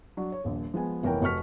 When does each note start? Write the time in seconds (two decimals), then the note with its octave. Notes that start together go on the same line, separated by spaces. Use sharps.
0.17 F#3 D4
0.32 C#5
0.44 D#1 A#1
0.74 F3 G#3 B3 G#5
1.03 F1 E3 B3 A#4 C#5 G5
1.22 F1 F#4 C#6 F6 B6